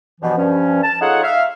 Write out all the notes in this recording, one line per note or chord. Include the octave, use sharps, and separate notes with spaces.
G2 B2 E3 F3
G2 F3 C#4
A5
D#4 F4 G#4 A4 C#5 F#5
E5 F5